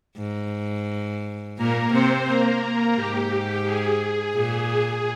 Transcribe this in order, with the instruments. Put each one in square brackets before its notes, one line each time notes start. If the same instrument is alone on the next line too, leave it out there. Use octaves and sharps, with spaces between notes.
[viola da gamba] G#2
[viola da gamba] A#2 [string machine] A#3 A#4
[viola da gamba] C3 [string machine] C4 C5
[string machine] A#3 A#4
[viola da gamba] G#2 [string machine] G4
[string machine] G#4
[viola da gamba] A#2